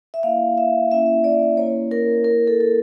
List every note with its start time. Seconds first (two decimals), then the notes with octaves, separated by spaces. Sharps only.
0.14 E5
0.23 A#3 E4 F5
0.58 E5
0.91 A#3 C#4 E4 E5
1.24 D5
1.57 A#3 C#4 E4 C#5
1.91 A#4
2.25 A#3 E4 A#4
2.47 A4
2.60 A4